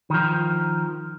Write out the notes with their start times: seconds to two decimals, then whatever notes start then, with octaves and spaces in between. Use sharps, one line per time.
0.10 D#3 F3